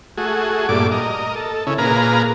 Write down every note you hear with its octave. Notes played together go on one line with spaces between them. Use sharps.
A3 F#4 G#4
G2 A#2 A3 D5 D6
A#4 D#5
A4
C#3 C#4 E4
A#2 G#4 A#4 B4 F5 A#5